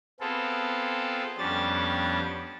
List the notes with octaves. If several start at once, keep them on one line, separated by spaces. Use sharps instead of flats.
B3 C4 F4 G#4 A4
F2 G3 B3 C#4 D4 A6